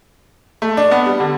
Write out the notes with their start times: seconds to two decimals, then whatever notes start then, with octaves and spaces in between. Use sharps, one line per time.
0.62 A3
0.77 D4
0.91 B3
1.06 G3
1.20 D3